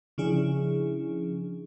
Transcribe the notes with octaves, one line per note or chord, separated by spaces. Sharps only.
C#3 F3 C#4 D4 E4 G#4